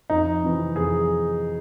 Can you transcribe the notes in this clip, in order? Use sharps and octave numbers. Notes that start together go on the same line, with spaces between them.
F2 D#4
C3 E3
F2 G#4